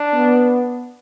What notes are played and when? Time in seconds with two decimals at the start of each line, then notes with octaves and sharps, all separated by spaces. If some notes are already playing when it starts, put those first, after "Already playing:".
Already playing: D4
0.14 B3